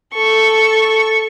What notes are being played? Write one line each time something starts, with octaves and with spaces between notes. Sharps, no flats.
A4 C#6